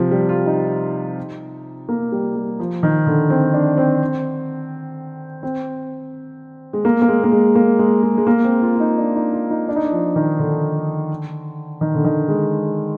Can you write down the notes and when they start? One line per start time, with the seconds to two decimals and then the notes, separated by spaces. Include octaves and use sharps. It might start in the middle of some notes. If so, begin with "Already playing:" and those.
Already playing: C3 F3
0.11 G3
0.29 F4
0.46 D#4
1.89 A#3
2.12 G3
2.36 G3
2.60 F3
2.83 D#3
3.07 D3
3.30 C4
3.54 D4
3.78 C4
5.43 C4
6.73 G#3
6.85 A#3
7.02 A#3
7.08 G#3
7.24 A#3
7.32 G#3
7.55 A#3
7.79 G#3
8.03 G#3
8.18 G#3
8.27 A#3
8.44 C4
8.62 F4
8.75 F4
8.80 D#4
8.98 D4
9.15 D#4
9.33 F4
9.51 D#4
9.69 D4
9.76 D#4
9.84 D4
9.92 F3
10.16 D#3
10.39 D3
11.81 D#3
11.95 D3
12.05 D#3
12.28 G#3